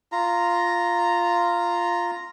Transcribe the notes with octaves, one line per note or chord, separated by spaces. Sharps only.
F4 A#5